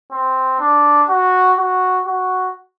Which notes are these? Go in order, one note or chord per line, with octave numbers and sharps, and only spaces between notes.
C4
D4
F#4
F#4
F#4